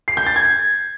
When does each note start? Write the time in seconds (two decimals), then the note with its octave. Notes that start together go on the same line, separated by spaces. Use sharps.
0.08 C7
0.17 G6
0.27 A6
0.36 G#6